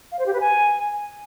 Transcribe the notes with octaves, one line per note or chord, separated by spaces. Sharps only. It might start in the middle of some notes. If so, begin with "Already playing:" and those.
F5
C5
G4
B4
G#5